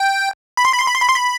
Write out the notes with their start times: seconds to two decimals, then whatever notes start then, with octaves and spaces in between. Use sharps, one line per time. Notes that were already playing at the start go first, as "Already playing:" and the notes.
Already playing: G5
0.57 B5
0.65 C6
0.73 B5
0.80 C6
0.87 B5
0.94 C6
1.01 B5
1.09 C6
1.16 B5